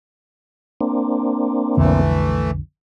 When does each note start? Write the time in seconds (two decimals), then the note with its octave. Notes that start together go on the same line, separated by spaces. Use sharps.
0.81 A#3 C4 D4
1.77 B1 F2 D3 E3 A3